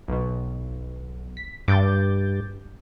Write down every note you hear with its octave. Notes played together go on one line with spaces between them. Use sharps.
B1 B2
B6
G2 D6 G6 A6